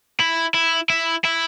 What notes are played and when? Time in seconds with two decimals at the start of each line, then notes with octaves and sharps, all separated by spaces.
0.20 E4
0.55 E4
0.90 E4
1.25 E4